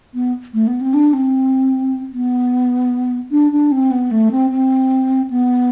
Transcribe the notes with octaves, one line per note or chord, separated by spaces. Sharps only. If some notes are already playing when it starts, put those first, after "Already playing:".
B3
A3
B3
C4
D4
C4
B3
D4
D4
C4
B3
A3
C4
C4
B3